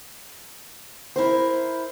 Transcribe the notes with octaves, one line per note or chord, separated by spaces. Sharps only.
E4 A#4 C5